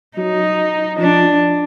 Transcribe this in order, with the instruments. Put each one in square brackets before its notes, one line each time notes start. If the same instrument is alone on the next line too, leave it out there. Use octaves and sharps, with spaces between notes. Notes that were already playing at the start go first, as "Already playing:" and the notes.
[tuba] F#3 [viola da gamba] D#4
[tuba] F3 [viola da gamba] D4